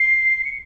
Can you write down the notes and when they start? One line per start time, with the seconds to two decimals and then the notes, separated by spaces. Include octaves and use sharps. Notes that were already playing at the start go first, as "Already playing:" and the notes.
Already playing: C7
0.45 C#7